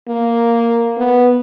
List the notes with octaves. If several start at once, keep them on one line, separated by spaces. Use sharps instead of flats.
A#3
B3